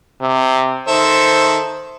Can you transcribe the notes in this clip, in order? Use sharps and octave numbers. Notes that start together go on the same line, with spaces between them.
C3
D#3 A4 C5 E5